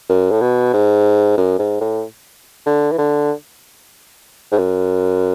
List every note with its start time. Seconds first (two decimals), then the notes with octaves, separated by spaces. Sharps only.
0.09 F#2
0.31 A2
0.41 B2
0.73 G#2
1.38 F#2
1.59 G#2
1.81 A2
2.66 D3
2.92 E3
2.98 D3
4.52 G#2
4.58 F#2